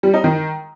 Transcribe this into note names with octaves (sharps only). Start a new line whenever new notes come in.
G3
D#4
D#3